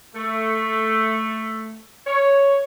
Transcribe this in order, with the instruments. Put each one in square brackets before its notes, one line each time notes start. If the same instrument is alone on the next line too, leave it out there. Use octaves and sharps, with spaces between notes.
[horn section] A3
C#5